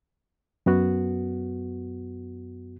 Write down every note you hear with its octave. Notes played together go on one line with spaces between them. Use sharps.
F#2 B3 F#4